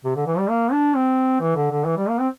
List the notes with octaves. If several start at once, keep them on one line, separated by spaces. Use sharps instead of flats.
C3
D3
E3
G3
A#3
D4
C4
E3
D3
D3
E3
G3
A#3
C4